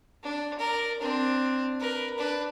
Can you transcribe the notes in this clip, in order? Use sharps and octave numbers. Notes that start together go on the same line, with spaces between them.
D4
A#4 D5
C4 D4
A#4 B4
D4 B4